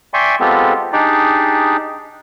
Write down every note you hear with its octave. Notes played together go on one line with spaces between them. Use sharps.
D5 E5 G5 G#5 C6 C#6
G#3 B3 C4 F4 G4 A4
D4 D#4 G4 G#4 D5